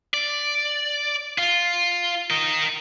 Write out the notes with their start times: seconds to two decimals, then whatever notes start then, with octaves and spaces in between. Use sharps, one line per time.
0.14 D5
1.38 F4
2.30 A#4 D#5